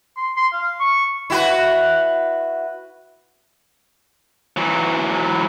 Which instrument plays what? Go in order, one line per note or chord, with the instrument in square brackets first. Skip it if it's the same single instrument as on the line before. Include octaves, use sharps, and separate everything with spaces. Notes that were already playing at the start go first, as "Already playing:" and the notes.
[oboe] C6
C6
F5
C#6
[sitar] E4 F#4 B4
[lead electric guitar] E3 F#3